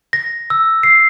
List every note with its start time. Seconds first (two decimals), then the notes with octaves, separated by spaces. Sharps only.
0.13 A#6
0.50 E6
0.83 C7